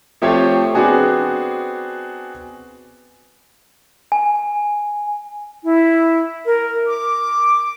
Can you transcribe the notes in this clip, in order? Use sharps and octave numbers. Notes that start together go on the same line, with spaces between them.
F3 A3 C4 G4 C#5
B3 C4 D4 F#4 G#4
G#5
E4
A#4
D6